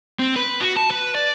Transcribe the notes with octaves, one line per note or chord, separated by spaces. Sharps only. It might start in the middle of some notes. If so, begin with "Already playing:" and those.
C4
B4
F#4
A5
B4
D5